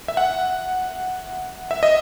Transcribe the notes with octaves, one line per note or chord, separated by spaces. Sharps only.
E5
F#5
E5
D#5